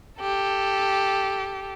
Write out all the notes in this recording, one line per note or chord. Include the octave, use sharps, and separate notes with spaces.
G4 A4